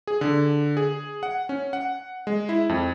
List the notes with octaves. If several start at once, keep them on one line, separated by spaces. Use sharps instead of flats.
G#4
D3
G#4
F#5
C#4
F#5
G#3
E4
F2